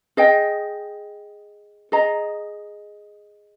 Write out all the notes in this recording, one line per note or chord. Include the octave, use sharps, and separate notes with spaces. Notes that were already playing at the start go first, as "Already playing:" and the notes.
G#4 D#5 G5
G#4 D#5 A#5